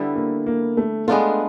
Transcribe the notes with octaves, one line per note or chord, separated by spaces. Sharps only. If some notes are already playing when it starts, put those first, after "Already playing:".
Already playing: D3 G3 B3 E4
A#3
A#3
A3
G#3 A3 B3 D4 F4